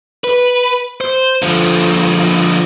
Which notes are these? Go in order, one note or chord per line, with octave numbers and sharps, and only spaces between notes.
B4
C5
D3 F3